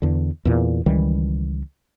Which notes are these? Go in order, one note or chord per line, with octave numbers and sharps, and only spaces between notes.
E2 D3
E2 A#2
C#2 D#3 E3 G3